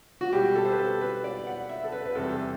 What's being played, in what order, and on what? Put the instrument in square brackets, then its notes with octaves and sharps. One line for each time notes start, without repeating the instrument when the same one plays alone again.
[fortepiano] F#4
B2 G3 G4
A4
C5
B4
A4
B4
D5
F#5
E5
A4
B4
B4
E2 C3 G3 A4